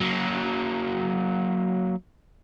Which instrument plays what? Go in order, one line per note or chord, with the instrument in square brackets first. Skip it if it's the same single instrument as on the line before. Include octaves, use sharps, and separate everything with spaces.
[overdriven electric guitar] F#3 A#3